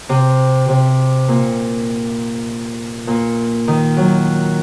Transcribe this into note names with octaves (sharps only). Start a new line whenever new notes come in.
C3
C3
A#2
A#2
D#3
F#3